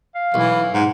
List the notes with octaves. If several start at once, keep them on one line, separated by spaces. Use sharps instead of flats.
F5
B1 E3 E4
G#2 F#5